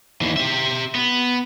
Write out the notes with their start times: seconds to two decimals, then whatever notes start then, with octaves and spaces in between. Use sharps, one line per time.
0.21 D#2 E3
0.37 G4 E5
0.95 B3